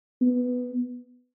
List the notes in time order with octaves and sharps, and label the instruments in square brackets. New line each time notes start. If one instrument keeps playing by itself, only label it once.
[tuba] B3